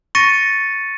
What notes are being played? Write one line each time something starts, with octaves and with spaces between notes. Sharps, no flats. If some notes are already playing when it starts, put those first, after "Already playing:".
C#6 A6 A#6 C#7 D#7